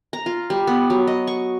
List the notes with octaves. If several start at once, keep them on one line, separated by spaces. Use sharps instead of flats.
A#5
F4
G3
B3
F#3
D#5
C#6